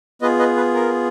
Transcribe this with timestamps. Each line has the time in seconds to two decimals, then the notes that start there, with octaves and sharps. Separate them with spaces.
0.22 B3 F4 G#4 B4 D#5
0.39 B4 D#5
0.57 B4
0.74 A#4